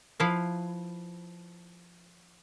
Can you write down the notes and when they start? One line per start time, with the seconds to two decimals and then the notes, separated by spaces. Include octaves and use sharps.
0.20 F3 E4 B4 F5